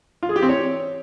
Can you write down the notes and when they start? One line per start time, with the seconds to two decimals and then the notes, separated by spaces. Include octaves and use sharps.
0.23 F4
0.29 G#4
0.36 G4
0.42 C4
0.49 C#5